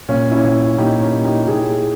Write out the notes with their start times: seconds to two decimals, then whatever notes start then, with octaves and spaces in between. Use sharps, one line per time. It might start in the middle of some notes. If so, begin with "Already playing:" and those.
0.09 A#2 C#4
0.32 C#4 E4
0.43 A#2
0.78 A#2 D#4 G4
1.01 C#4 E4
1.13 A#2
1.24 D#4 G4
1.47 A#2 E4 G#4